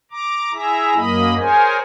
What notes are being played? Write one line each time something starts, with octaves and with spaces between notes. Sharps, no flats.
A#5 D6
E4 G#4 E5 A#5
F#2 A#3 D#5 B5
G#4 A#4 C5 C#5 G#5